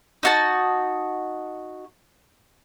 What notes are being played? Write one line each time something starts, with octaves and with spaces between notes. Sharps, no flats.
D#4 F#4 A5